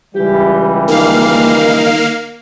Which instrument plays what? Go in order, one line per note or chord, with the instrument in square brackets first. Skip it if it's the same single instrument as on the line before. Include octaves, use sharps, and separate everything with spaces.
[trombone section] C#2 E3 G3 [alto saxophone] G4
[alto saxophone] D#3 [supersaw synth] A#3 F5